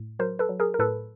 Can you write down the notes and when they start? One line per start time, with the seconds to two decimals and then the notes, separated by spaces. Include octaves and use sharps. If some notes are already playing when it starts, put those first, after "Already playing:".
Already playing: A2
0.19 F#3 A#4 C5
0.39 A4 B4
0.49 F#3
0.60 G#4 A#4
0.74 A#4
0.79 A2 A4 B4